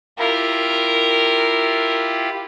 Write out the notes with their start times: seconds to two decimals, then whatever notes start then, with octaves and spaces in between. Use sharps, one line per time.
0.19 E4 F4 G4 A#4